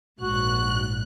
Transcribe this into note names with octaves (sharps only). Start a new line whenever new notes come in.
A#1 G#2 F#4 F#6